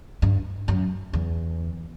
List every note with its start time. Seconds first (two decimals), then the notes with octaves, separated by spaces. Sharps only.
0.22 G2
0.68 F#2
1.13 E2